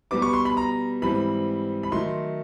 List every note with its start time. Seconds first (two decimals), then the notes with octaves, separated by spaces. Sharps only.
0.11 B2 G3 B3 D6
0.22 C#6
0.33 C6
0.45 B5
0.57 A#5
1.02 G#2 E3 G3 C4 B5
1.83 B5
1.92 D#3 F#3 A3 C6